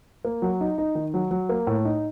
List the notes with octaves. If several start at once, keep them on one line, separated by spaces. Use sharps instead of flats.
A#3
F#3
D#4
D#4
D#3
F#3
F#3
A#3
A2
D#4